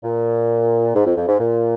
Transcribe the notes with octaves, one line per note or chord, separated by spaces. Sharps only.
A#2
G#2
F2
F2
G#2
A#2